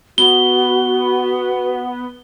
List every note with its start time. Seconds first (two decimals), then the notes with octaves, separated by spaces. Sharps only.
0.18 B3 F#4 G7